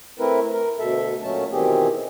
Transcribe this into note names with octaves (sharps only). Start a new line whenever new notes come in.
A3 C4 E4 A#4 B4
A#4
D2 B2 A4 E5
A#2 F#3 A3 C#4 A5
B2 D#3 E3 C4 G4 G#4